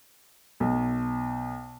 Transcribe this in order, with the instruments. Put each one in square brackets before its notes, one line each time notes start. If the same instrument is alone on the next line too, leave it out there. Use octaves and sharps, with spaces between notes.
[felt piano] B1